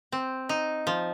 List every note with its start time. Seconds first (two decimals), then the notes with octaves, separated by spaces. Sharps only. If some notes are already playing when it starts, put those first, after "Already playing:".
0.12 C4
0.49 D#4
0.87 F3